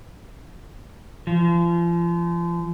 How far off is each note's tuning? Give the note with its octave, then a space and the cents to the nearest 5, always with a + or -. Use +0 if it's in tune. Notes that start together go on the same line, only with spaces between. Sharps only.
F3 -35